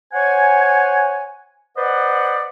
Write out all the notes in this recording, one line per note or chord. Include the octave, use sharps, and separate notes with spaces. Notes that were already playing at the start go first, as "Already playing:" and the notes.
C5 C#5 F#5 G#5
B4 C5 D5 D#5 F#5